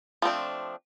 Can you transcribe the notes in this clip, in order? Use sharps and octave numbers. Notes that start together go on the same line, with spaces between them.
F3 A3 C4 D4